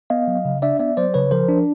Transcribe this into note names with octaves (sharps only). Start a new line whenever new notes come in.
B3 D#5 F5
F#3
C#3
D4 D5 E5
B3 D5 E5
F#3 C5 D5
C#3 B4 C#5
F3 A#4 C5
D4